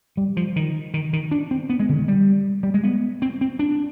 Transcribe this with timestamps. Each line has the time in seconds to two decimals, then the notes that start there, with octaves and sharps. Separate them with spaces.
0.17 G3
0.37 F3
0.56 D#3
0.94 D#3
1.13 D#3
1.31 D4
1.51 C4
1.69 B3
1.80 G#3
1.89 D3
1.98 D#3
2.08 G3
2.63 G3
2.74 G#3
2.83 B3
3.22 C4
3.41 C4
3.59 D4